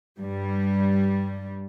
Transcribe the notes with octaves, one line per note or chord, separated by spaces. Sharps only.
G2 G3